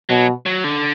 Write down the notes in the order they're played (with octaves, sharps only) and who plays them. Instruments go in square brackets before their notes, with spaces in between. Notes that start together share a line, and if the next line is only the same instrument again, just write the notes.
[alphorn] B2 [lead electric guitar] F#3
[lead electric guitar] F#3
D3